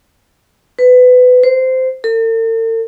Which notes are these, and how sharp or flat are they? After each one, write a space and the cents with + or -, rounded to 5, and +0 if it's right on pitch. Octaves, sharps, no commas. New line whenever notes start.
B4 +25
C5 -15
A4 +45